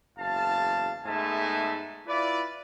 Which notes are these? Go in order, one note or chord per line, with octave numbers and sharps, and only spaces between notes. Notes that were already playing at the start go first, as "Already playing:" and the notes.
F#1 E2 F5 A5
G#2 A3 B3 E5 G#5 A5
E4 F4 B4 D5